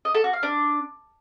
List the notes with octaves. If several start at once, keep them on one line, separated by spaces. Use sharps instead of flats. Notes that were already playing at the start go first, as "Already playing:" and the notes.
D#5
A4
F#4
F5
D4